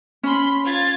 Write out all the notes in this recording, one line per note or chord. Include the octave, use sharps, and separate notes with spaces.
C#4 B5 C6
F4 G#6 A6